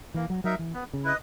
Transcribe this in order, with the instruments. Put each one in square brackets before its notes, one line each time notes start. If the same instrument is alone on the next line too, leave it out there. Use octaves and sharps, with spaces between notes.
[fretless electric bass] E3 [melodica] A#3
[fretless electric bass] F#3
[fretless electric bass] F#3 [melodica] D#4 A#4 E5
[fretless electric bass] E3
[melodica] B3
[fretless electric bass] C#3
[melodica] E4 B4 D#5